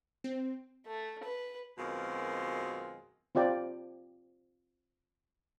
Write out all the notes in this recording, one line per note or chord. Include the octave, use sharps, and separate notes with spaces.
C4
A3
B4
F#2 B2 D#3 G#3 C4 F4
C4 F4 G4 D5 G5